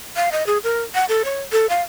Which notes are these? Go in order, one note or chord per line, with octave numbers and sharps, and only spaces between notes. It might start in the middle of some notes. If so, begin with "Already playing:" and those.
F5
D#5
G#4
A#4
F#5
A4
C#5
A4
F5